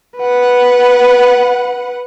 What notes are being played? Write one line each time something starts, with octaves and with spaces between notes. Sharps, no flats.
B4 F#5